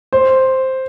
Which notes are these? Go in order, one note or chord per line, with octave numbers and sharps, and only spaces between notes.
C5